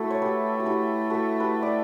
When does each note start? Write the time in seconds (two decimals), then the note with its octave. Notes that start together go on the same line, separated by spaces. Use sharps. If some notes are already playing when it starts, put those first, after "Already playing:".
Already playing: A3 E4 F#4 A4
0.11 C#5
0.22 G4 B4
0.60 F#4
0.66 E4 G4
1.10 F#4 A4
1.40 G4 B4
1.62 D5